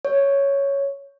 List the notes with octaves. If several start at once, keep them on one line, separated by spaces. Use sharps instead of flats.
C#5